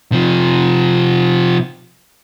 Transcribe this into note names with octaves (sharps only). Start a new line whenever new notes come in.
C3 F3